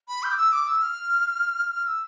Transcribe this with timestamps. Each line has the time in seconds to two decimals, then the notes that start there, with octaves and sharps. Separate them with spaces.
0.08 B5
0.23 G6
0.31 D6
0.38 E6
0.52 D6
0.67 E6
0.82 F6
1.71 F6
1.86 E6